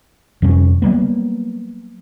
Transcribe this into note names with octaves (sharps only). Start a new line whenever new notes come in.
F2 C3 G3 C#4
F#3 G3 A#3 B3